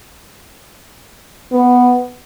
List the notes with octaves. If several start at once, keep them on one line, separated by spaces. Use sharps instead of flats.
B3